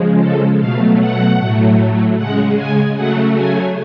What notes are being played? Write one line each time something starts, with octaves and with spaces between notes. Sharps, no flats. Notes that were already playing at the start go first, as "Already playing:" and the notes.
Already playing: C#3 F3 G#3
A4
B2 F#3 A3 F5
F#5
A2 F#3 A3
C#3 G#3 F#5
G#5
C#3 F#3 A3 F#5
G#5